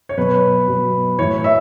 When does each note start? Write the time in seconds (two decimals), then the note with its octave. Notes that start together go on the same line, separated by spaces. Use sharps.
0.09 C#5
0.17 B2 F#3 B4
0.68 B2 F#3
1.18 E3 C#5
1.22 A2
1.44 E5